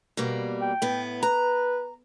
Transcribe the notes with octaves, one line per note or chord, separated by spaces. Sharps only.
B2 G3 A#3
G5
A2 B3
B4 A#5